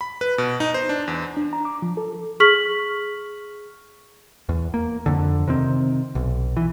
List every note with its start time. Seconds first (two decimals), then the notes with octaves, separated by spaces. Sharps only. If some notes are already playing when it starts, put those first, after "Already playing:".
0.01 B5
0.21 B4
0.38 B2
0.60 D#4
0.74 C5
0.89 D4
1.08 E2
1.37 D4
1.53 A#5
1.65 D6
1.82 F3
1.97 A4
2.40 G#4 C#6 F6 B6 F#7
4.49 E2
4.74 A#3
5.06 F2 D3
5.47 C3 D#3 C4
6.15 B1
6.57 E3